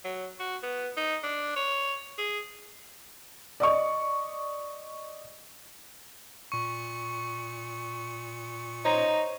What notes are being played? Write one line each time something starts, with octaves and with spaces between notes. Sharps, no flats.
F#3
F#4
B3
D#4
D4
C#5
G#4
D5 D#5 C#6
A#2 C#6 C#7
D#4 C5 C#5 A#5